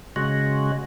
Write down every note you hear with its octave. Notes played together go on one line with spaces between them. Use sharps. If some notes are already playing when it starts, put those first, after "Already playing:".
C#3 G#3 F#4